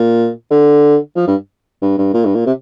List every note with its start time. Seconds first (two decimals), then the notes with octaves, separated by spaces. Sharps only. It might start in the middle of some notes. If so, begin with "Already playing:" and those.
Already playing: A#2
0.51 D3
1.16 F3
1.27 G2
1.82 G2
1.98 G2
2.14 A#2
2.25 G2
2.35 A#2
2.46 C3